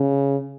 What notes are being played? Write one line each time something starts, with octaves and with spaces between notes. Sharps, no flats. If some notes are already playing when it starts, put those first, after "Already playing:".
Already playing: C#3